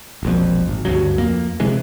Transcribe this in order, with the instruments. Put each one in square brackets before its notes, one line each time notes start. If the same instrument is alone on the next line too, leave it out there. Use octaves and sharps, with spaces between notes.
[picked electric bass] E1 A#1 F2
G#1
D2 G2 C#3 F#3
F2 A#3
C3 E3 G#3